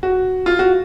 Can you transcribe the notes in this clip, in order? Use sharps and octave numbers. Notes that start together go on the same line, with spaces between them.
F#4
F4
F#4